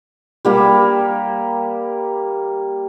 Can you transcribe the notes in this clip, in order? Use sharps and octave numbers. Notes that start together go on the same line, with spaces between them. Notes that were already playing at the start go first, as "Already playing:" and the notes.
G3 A#3 G4